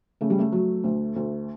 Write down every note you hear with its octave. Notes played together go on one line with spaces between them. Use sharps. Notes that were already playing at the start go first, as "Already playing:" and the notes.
C#3 A3
G3
A3
F#3
D2
D2